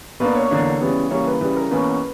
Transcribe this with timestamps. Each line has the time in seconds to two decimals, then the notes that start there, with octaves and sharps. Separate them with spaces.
0.20 B2 A#3 D4 B4
0.35 C#5
0.50 E2 D3 A#3 D4
0.80 C#3 E3 G3 B3
1.10 C#3 E3 G3 A#3 C#5
1.26 B4
1.41 C#3 E3 G3 B4
1.56 A#4
1.71 E2 B2 A#3 C#4 B4